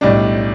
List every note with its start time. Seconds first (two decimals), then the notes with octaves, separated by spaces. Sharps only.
0.01 B1 A2 G3 D4